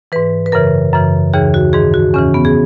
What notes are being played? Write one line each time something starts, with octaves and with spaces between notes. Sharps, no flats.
G#2 E3 B4
B4
F#2 C#3 E3 A#4
F#2 C#3 E3
D#2 C#3 E3 G#4
F#4
G#2 D#3 G#4
F#4
E2 C#3 E3 C#4
B3
G#4